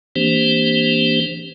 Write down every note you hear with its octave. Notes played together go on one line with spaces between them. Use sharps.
E3 A#3 C4 D4 G4 C5